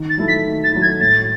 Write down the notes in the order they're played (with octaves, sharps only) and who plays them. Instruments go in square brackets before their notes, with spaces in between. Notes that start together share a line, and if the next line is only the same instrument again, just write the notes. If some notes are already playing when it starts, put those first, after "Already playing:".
Already playing: [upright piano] D#3
[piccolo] A6
[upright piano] F#3 A3 E4
[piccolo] B6
[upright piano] D#3
[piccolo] A6
[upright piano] F#3 A3 E4
[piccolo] G#6
[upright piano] A2 [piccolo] A6